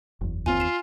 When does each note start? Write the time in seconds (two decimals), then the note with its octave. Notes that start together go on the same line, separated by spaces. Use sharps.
0.21 F#1 E2
0.46 D#2 C4 F4 G#5 D#7
0.60 C7 E7